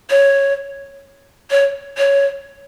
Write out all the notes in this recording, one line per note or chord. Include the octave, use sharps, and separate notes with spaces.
C#5
C#5
C#5